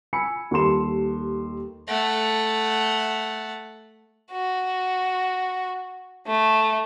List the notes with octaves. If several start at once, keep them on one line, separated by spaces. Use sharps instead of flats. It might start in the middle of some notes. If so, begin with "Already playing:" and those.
G#5 B5 E6 C#7
D#2 G3 A4 C6 E7
A3 F#5
F#4
A3